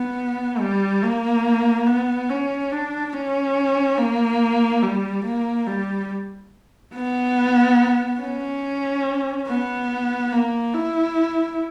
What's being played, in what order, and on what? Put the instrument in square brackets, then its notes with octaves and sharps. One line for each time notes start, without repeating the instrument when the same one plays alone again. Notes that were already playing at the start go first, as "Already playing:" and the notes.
Already playing: [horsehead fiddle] B3
G3
A#3
B3
C#4
D4
C#4
A#3
G3
A#3
G3
B3
C#4
B3
A#3
E4